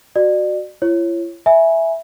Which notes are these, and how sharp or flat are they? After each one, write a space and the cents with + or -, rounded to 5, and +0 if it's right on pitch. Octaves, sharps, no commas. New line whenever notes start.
F#4 +0 D5 +35
E4 +45 C#5 -15
E5 +0 G#5 +0 B5 -20